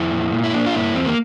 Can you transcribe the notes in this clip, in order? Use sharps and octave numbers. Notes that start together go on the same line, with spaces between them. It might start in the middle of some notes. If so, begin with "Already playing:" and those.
Already playing: F2 E4
A#2
A#2
E4
A#3 D4
F4
G2 E4
E2 C4
A#3